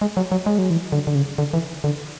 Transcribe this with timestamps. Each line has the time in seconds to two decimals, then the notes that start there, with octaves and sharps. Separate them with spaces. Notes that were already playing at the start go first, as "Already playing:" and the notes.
0.01 G#3
0.17 F#3
0.32 F#3
0.46 G#3
0.59 F#3
0.70 E3
0.92 D3
1.07 D3
1.15 C#3
1.38 D3
1.54 E3
1.84 D3